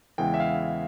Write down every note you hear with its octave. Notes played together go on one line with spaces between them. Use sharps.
E2 C#3 E3 G#3 B3 G5
E5
F5